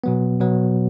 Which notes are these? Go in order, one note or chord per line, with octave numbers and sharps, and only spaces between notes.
B2 F#3 B3
B2 F#3 B3